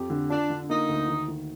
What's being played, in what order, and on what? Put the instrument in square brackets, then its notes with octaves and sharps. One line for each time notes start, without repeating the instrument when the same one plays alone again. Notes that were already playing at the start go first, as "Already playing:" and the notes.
Already playing: [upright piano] F2 G4
D3
[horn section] D4 [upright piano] F4
[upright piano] D3
[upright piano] A#3 [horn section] D#4
[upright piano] D2
D#3
D#3